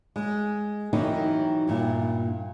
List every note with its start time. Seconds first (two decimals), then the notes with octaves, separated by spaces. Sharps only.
0.16 G#3
0.93 D#3 E3 F#3 D#4 E4 G4
1.68 G2 A#2 E4